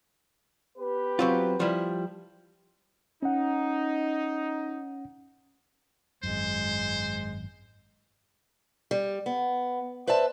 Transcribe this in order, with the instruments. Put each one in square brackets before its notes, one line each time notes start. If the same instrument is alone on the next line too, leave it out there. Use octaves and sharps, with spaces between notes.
[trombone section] B3 G4 B4
[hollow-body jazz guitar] F#3 C4 F4
F3 G3 E4
[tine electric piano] C#4 F#5 [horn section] D#4
[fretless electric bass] G#1 F#2 [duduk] G#3 [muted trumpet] C5
[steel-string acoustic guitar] G3
B3
B4 C5 D5 E5 A5